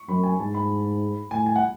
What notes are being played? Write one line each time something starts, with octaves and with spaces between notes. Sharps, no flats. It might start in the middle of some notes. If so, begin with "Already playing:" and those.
Already playing: C#6
F#2 B5
G#5
G#2 A5
B5
A2 G#5
G#5
F#5